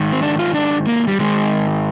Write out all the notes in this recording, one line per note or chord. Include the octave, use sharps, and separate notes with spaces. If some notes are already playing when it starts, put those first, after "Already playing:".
Already playing: G#2 D#3
C4
D4
F4
D4
A#3
G3
G#2 D#3 G#3